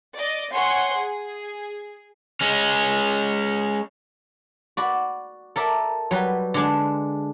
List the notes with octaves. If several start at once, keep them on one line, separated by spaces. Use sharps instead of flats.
D5 D#5
C#5 F#5 G#5 C6
G#4
G#3 C#4
F#4 D5 B5
A4 A#4 D5 E5
F#3 G3 B4
D3 G#3 D4